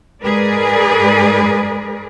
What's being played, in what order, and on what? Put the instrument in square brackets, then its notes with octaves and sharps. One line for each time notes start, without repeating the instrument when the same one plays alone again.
[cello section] G#2 G#3 G#4 A#4 B4 D5